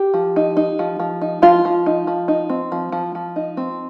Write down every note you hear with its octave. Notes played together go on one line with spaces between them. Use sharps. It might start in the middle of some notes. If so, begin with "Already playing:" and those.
Already playing: G4
F3
D#4
D#4
F3
F3
D#4
F3 F4
F3
D#4
F3
D#4
C4
F3
F3
F3
D#4
C4